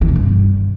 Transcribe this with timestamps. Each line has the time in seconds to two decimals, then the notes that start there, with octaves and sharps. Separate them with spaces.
0.01 E3
0.08 B2
0.16 G2